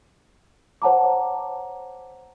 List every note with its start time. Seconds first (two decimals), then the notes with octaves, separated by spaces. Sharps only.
0.82 C5 C#5 F#5 A5 A#5 D6